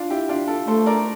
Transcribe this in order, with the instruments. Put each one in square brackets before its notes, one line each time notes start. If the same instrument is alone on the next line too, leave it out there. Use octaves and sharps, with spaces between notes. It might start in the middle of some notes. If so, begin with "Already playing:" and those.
Already playing: [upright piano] D4 F4
E4 G4
D4 F4
F4 A4
[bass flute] A3 [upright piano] A4 C5
[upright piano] A#4 D5